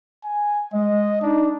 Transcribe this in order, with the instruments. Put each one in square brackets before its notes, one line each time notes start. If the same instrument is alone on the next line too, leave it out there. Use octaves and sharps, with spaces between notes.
[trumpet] G#5
[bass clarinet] G#3 [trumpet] D#5
[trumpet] D4 [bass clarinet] D#4